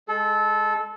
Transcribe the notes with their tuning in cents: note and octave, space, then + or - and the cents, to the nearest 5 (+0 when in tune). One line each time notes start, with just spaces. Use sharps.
G#3 +0 A4 -20